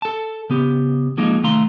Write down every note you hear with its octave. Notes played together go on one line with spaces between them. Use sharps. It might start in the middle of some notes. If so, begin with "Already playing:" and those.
A4 A5
C#3 B3 G4
F3 G#3 A#3 D#4 F4
C2 D#3 A3 F5 A#5 C6